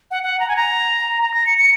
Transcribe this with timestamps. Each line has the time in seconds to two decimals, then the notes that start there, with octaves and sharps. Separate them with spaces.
0.11 F#5
0.23 F#5
0.40 A#5
0.49 G#5
0.56 A#5
1.22 A#5
1.34 A#6
1.46 C#7
1.58 C#7